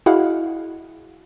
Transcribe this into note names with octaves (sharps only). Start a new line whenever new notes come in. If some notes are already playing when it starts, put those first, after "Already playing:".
E4 F#4 G#4 D#5 F5 F#5